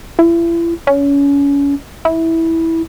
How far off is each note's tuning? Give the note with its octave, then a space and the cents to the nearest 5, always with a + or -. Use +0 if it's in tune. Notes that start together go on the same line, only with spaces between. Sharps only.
E4 +40
C#4 +30
E4 -10